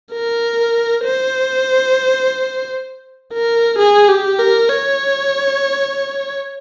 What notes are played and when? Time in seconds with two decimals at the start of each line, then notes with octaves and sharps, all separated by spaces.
0.13 A#4
1.05 C5
3.33 A#4
3.79 G#4
4.09 G4
4.39 A#4
4.70 C#5